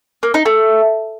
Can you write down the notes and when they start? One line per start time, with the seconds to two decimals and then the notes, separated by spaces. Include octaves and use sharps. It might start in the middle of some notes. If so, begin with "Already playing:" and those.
0.23 A#3
0.34 D#4
0.46 A3